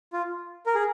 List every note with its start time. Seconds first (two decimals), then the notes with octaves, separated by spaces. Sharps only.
0.13 F4
0.66 A#4
0.75 G#4